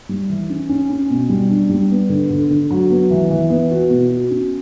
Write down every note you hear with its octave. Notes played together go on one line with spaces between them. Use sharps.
G3
E3
C#4
C#4
C#4
B2
G3
D4
G3
B3
D3
D3
D3
F#3
B3
E3
E3
B3
F#4
B2
F#4
C#4